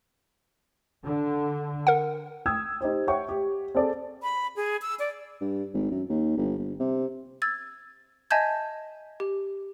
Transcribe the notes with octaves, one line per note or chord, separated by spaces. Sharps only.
D3
A#4 F#5
G5 D#6 E6 G#6
D#4 G4 C5
C#5 E5 F#5 G5 C#6
G4
C4 G#4 A4 D5
B5
G#4
E6
D5
G2
G#1
F#2
D#2
G1
G1
C3
E6 G#6 A6
D#5 E5 G#5 A5 G6 G#6
G4